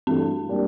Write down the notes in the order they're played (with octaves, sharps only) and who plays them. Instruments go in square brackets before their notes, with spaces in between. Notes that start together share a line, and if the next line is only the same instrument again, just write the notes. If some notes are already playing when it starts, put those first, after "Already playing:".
[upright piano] G2 E3 A3 [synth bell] C4
[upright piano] G3 A#3 D4 G4